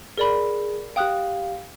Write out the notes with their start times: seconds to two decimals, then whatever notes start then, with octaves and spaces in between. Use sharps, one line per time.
0.18 G#4 A#4 D5 B5
0.96 G4 F5 G5 D#6 F#6